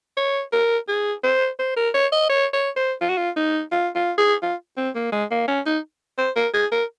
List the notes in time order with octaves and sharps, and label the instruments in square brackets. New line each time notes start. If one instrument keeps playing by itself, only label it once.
[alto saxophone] C#5
A#4
G#4
C5
C5
A#4
C#5
D#5
C#5
C#5
C5
F4
F#4
F4
D#4
F4
F4
G#4
F4
C4
A#3
G#3
A#3
C#4
D#4
C5
A#4
G#4
A#4